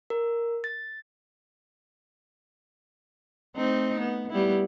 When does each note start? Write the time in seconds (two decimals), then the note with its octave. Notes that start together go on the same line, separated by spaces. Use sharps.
0.10 A#4
0.64 A6
3.56 A3 C4 D#4
4.00 B3
4.30 G3 B3 E4